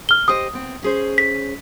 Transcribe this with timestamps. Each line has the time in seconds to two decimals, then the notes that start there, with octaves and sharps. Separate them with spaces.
0.09 F6 G7
0.28 G4 C5 D#5 D#6
0.53 B3 C4
0.83 C#4 G#4 C5
1.18 B6